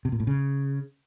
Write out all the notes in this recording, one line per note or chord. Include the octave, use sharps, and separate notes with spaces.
C3
A#2
A2
C#3